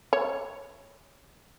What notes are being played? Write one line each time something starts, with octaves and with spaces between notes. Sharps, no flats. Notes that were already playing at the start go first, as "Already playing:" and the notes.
C#5